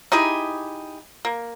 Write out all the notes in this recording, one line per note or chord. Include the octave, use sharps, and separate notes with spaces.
D#4 E4 G4 G#4
A#3